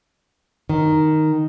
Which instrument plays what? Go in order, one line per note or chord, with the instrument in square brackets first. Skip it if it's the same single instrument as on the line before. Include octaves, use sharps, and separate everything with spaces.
[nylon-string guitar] D#3